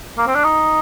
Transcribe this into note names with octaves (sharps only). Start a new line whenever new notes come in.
A#3
C4
D4
D#4